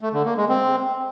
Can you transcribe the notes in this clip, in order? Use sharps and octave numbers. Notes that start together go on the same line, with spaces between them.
A3
D3
A#3
G#3
C4